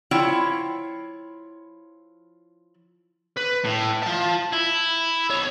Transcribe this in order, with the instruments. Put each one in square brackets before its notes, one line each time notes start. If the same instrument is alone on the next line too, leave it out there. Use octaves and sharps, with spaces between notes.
[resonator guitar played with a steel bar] F3 E4 C#5 G5
[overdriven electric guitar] B4
A2
F4 A5
E4
B1 C#5